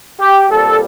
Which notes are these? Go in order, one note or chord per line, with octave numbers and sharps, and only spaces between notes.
G4
A#2 G3 C4 A4